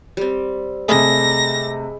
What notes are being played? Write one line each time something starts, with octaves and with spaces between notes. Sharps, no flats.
G3 C4
C3 A3 G#4 D#5 B5 A#6